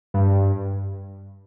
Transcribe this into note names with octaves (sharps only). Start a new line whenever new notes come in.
G2